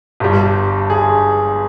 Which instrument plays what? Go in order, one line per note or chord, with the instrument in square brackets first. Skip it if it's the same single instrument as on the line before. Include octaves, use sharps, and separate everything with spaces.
[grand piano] G1 G2 G3
[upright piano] G#4